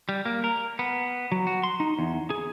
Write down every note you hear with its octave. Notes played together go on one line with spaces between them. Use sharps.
G3
A#3
A#4
B3
F#3
F#4
C6
D#4
E2
G#4